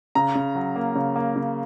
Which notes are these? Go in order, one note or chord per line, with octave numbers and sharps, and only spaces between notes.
C#3 A#5
C#3
F#3
A#3
C#3
A#3
C#3